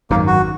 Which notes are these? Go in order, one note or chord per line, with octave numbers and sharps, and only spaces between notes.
G#1 F#2 D#3 A#3
F#4